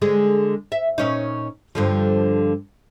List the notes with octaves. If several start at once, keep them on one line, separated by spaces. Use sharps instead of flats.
D3 G#3 G#4
E5
A#2 C#4 D#4
G2 D3 F3